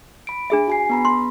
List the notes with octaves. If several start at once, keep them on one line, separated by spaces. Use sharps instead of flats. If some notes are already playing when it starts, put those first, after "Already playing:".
B5 D7
D4 G#4 E5
F#4 G#5 C7
B3 A#5 B5
C6